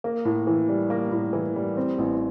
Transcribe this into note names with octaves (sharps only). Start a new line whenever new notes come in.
A#3
A2
E3
G3
A#3
A2
E3
G3
C4
A1